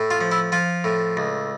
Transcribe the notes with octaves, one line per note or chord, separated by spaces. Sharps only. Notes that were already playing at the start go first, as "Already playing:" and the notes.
Already playing: A2
F4
F3
E4
F3 F4
A2
C#2